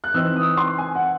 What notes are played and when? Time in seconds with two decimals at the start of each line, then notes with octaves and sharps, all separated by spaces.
0.04 F#6
0.14 E3 C4 D#4 E6
0.36 D#6
0.57 C6
0.78 G#5
0.95 F#5